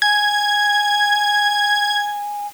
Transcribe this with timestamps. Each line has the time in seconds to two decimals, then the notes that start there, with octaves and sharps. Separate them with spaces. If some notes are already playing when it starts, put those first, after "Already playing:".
0.02 G#5 G#6